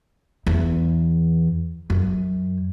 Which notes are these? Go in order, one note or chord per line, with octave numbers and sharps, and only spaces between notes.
E2
F#2